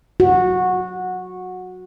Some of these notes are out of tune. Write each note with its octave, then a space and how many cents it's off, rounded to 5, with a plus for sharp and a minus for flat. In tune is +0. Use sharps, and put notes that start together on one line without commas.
F#4 -15